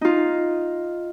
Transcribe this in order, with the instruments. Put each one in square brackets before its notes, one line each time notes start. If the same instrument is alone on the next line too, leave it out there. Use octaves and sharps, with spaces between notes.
[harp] D#4 F4